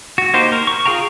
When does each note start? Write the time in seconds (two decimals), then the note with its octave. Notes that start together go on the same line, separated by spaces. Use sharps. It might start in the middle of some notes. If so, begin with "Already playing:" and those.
0.18 F#4
0.33 A#3 D#4 G4 C5
0.52 A#4
0.67 C#6
0.86 F4 G#4 F5 G5 A#5